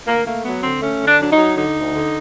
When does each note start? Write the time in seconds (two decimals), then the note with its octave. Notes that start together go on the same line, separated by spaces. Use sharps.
0.06 D2 A#3
0.25 A3 A#3
0.44 F#3 B3
0.63 D3 C4
0.81 A3 C#4
1.01 D3
1.07 D4
1.20 F#3 D4
1.32 D#4
1.38 F#3
1.56 D3 D#4
1.75 D2
1.94 D3